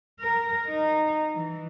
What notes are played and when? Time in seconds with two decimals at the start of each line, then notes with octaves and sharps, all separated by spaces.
0.20 A#4
0.68 D#4
1.35 E3